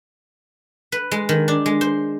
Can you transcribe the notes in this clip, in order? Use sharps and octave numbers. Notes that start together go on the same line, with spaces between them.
B4
G#3
D#3
D4
G#3
C5